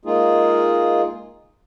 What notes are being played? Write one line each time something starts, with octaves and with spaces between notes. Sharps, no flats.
G#3 A#3 D#4 F4 G#4